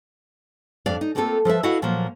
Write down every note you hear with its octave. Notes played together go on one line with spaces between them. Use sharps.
F2 D4 D5 F5
D#4
A3 A#3 C4 F4 G4 A4
F3 A4 B4 E5
E4 F#4 D#5 F5 F#5
A#2 F3 F#3 A#3